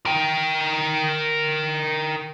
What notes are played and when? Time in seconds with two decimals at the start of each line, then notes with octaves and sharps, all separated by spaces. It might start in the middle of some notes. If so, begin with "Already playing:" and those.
0.06 A#4 G5